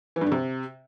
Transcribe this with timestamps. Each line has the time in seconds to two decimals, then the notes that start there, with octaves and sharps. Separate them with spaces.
0.16 E3
0.21 G2
0.27 D3
0.32 C3